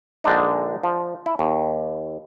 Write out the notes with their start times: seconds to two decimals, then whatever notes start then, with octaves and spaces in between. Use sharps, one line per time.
0.24 A#1 D3 G#3 D4 D#4
0.83 F3
1.26 E4
1.39 D#2